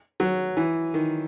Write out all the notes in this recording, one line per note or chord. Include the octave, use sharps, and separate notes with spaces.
F#3
E3
D#3